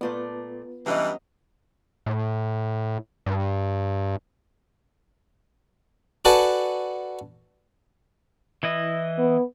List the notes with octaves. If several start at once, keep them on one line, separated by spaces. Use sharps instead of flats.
A#2 A3 B3 F4 B4 D5
G2 E3 F#3 C#4 D#5
A2
G2
F#4 A4 B4 D5 G#5 A5
E3 E4 D#5
B3